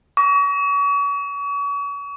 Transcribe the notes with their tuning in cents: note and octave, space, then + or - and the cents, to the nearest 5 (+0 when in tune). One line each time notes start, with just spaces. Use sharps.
C#6 +40